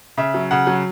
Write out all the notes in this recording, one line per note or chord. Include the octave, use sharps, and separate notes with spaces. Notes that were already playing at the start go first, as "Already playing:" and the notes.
C#3 E5
F#3
C#3 F#5
F#3